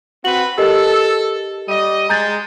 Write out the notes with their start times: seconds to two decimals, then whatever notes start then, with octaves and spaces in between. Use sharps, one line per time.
0.25 C4 F#4 B4 F#7
0.58 G4 A4 A#4 D#5
1.68 G3 D#5
2.09 G#3 A#5 G6 A6